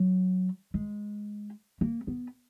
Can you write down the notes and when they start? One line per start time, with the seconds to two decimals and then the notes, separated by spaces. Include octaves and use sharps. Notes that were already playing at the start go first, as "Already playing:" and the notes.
Already playing: F#3
0.74 G#3
1.81 A#3
2.07 B3